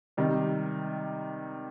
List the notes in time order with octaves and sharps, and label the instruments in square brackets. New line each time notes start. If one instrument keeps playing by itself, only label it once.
[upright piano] C3 D#3 G3 D#4